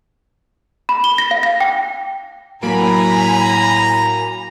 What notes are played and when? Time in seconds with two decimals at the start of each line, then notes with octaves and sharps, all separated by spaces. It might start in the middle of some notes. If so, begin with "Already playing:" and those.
0.89 B5
1.04 G7
1.18 A#6
1.31 F5
1.43 A#6
1.61 G5
2.63 A2 F#3 A#3 G#5 A#5 B5 D7